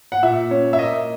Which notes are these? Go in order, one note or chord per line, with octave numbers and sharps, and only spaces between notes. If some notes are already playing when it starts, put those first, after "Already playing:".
F#5
A#2 E5
C#4
E5
A#3 D#5